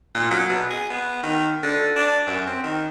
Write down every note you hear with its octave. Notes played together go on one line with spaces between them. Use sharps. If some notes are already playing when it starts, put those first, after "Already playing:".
A#2
F#3
B2
G#4
B3
D#3
D3
D4
F#2
C4
D#3